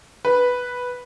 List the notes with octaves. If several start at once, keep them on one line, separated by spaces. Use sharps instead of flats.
B4